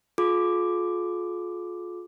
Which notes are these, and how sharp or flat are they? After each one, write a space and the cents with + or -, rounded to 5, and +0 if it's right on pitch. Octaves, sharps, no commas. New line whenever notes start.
F4 +25 G#4 +45 D6 +0